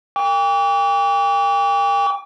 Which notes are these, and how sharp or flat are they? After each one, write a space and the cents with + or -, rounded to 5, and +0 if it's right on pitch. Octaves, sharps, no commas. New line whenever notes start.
G5 +35 D6 -45